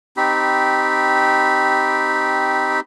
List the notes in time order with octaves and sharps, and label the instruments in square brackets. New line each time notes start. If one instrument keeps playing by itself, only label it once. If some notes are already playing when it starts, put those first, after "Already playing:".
[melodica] C4 D#4 G4 B5